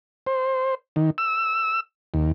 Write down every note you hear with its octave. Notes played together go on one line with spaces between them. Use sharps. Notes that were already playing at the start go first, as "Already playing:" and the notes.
C5
D#3
E6
D#2